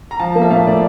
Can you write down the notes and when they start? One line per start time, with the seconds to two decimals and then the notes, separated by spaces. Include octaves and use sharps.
0.11 A#5
0.20 F3 A5
0.35 A#3
0.42 E5
0.50 A2 F5
0.67 A2 D5